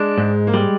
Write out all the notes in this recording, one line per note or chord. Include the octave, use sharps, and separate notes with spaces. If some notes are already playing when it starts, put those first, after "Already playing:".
Already playing: G#3 D4
G#2
A#3
G3 G#3